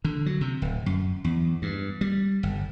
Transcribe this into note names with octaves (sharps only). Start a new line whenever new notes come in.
D3
F#3
C3
D1
F#2
E2
G2
G3
G1